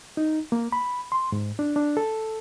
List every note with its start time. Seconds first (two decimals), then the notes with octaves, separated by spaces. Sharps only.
0.17 D#4
0.52 A#3
0.72 B5
1.12 C6
1.32 G#2
1.59 D4
1.76 D4
1.97 A4